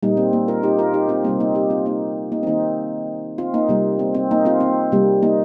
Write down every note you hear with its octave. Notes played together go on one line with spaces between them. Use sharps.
A#2 G3 A#3 D#4
C4
A#3
F4 A#4
D#4 G4
F4 A#4
D#4 G4
C4 F4
C3 G3 A#3 C4
A#3 D#4
D#4 G4
C4 F4
A#3 D#4
A#3 D#4
C4
D#3 A#3 D#4
C4 F4
A#3 D#4
C3 G3 A#3
C4
C4
A#3 D#4
C4 F4
C4
C3 G3 A#3
A#3 D#4